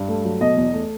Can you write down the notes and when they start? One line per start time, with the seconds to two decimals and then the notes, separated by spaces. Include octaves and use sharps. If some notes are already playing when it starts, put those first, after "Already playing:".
Already playing: G2
0.08 A3
0.24 F#3
0.41 B2 D#5
0.57 E2
0.73 A3